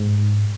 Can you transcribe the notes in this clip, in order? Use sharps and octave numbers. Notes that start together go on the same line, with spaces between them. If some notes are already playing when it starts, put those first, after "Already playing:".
Already playing: G#2